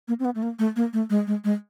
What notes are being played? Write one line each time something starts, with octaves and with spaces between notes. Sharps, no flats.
A#3
C4
B3
A3
A#3
A3
A#3
A3
G#3
G#3
G#3